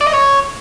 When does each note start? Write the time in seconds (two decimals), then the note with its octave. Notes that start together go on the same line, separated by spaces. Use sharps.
0.01 D5
0.07 D#5
0.13 C#5